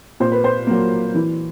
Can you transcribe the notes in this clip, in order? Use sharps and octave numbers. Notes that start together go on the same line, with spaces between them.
A#2 C5
B4
C5
F#3 A#3
E3